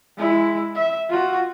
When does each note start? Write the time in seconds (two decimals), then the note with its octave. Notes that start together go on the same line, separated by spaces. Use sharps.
0.17 G#3 E4
0.75 E5
1.09 F4 F#4